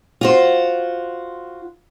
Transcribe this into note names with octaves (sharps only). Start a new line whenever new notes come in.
F4 F#4 C5